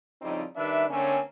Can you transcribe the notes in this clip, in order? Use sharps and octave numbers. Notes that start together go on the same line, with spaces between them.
F2 A2 C#3 G3 C4 D#4
D#3 G3 D4 B4 E5
D3 A3 A#3 C4 C#4